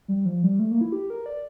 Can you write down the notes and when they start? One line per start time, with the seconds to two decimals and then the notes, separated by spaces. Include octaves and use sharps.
0.08 G3
0.26 F3
0.43 G3
0.59 A3
0.71 A#3
0.81 E4
0.92 G4
1.10 A#4
1.26 D5